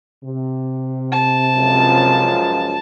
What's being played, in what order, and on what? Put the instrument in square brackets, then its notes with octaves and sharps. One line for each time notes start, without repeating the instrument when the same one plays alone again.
[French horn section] C3
[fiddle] A5
[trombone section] C#2 F#2 F3